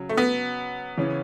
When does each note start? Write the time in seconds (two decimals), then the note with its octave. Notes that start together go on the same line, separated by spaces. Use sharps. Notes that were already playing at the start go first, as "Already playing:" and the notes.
Already playing: C#3 F#3 C#4
0.09 A3
0.17 B3
0.97 C#3 E3 C#4